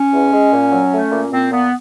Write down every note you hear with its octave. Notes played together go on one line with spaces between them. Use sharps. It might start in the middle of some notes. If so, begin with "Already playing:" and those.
Already playing: C#4
E2
G#3
A#2
F#3
A3
A#2
A#2 C4
A#2 B3